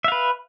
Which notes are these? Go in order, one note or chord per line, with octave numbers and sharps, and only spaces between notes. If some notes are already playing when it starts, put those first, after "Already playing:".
B4 E5 F5